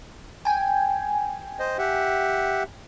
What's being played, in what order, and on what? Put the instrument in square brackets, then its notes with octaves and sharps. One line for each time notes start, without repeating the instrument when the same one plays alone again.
[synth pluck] G5 G#5
[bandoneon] C5 D#5
G4 E5 F#5